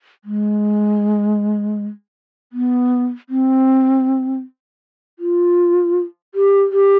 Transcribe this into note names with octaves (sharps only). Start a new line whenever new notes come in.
G#3
B3
C4
F4
G4
G4